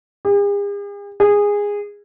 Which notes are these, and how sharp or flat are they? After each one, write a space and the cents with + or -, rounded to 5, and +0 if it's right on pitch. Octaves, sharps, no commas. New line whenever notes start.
G#4 -45
G#4 -15